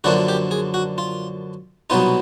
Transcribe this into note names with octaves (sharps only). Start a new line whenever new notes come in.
F#2 D3 F3 A#3 D4 F#4
G4
G#4
F#4
F4
C2 B2 F#3 B3 D#4 F4